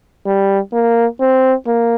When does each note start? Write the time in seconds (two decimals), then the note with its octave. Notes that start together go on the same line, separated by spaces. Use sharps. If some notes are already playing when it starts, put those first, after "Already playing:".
0.26 G3
0.73 A#3
1.20 C4
1.67 A#3